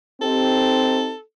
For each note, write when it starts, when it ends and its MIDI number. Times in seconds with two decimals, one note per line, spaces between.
0.21 1.13 60
0.21 1.13 63
0.21 1.13 67
0.21 1.21 69